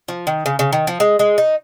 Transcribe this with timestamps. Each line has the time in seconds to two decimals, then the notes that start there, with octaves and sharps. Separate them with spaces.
0.08 F3
0.27 D#3
0.46 C#3
0.59 C#3
0.73 D#3
0.87 F3
1.00 G#3
1.19 G#3
1.38 D#4